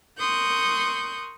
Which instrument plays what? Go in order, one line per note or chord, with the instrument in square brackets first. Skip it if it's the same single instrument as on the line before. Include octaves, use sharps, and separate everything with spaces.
[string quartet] A#4 C6 C#6 D#6 F#6 G6